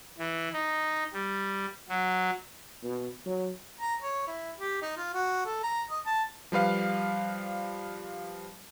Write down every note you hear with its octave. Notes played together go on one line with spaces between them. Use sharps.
E3
D#4
G3
F#3
B2
F#3
A#5
C#5
E4
G4
D#4
F4
F#4
A4
A#5
D#5
A5
F3 G3 B4 F5